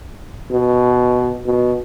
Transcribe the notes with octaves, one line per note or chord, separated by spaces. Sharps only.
B2
B2